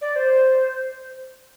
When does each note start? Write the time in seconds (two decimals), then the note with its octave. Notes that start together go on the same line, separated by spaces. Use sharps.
0.01 D5
0.16 C5